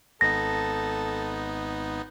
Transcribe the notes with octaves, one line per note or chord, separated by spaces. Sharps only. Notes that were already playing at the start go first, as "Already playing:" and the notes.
G#1 B3 D#4 A4 A#6